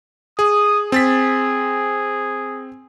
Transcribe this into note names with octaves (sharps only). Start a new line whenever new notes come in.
G#4 D#6
C4 G#4 A6 B6